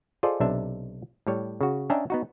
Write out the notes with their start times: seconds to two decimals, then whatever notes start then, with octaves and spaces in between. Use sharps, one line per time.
0.23 F4 G#4 A4 C5 D5 D#5
0.40 B1 C3 D4 E5
1.27 A2 G3 C#5
1.61 C#3 F#4
1.90 C#4 D4 D#5 E5 G5 A#5
2.10 B3 D#4 F#4